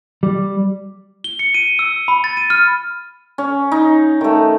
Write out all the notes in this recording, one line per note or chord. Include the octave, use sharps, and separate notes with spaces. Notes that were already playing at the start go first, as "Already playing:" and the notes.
G3
G7
C#7
D#7
E6
B5
A6
D#7
F6
C#4
D#4
D#3 A3